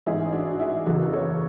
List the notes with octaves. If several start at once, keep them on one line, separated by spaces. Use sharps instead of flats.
A1 G#2 E3 E4 G#4
D4 F#4
F#4
E4 G#4
F#1 E2 C#3 E3 F#4 A4
A4 C#5